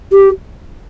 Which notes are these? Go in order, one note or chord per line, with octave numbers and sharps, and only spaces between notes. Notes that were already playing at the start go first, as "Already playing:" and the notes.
G4